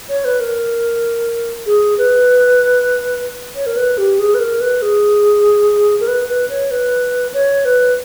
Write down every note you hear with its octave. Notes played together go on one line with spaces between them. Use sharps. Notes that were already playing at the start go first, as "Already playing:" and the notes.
C#5
B4
A#4
G#4
B4
C#5
A#4
B4
G4
G#4
B4
A#4
B4
G#4
A#4
B4
B4
C#5
B4
C#5
B4